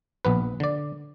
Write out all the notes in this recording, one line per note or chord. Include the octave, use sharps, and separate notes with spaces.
A#1 B3 B4
D3 D5